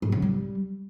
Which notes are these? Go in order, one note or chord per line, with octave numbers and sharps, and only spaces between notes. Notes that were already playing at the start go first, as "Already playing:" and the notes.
G#2
C#3
G3